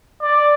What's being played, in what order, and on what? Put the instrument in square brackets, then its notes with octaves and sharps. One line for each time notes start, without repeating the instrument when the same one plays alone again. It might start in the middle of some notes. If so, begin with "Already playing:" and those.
[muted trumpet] D5